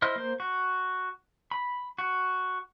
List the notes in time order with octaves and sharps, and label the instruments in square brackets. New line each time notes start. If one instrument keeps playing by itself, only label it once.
[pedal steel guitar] E4 C5 D#5 F6
A#3 C5
F#4
B5
F#4